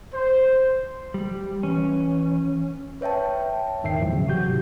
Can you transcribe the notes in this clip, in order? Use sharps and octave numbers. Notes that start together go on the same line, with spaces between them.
C5
G3
E3 C#4
B4 C#5 E5 G5 A5
E2 G#2 D#3 E5 G5 C7
E2 A2 F3 F#3
C#3
C3 E3 F#3 F#4 G4 G6
G#2